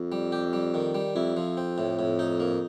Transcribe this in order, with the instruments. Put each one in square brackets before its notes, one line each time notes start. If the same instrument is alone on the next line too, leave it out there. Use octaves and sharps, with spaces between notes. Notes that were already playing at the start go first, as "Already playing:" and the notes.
Already playing: [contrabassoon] F2
[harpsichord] G3
G4
G3
D#3
G3
[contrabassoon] F2 [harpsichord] E4
[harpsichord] F3
C4
A2
A2
D#4
A#3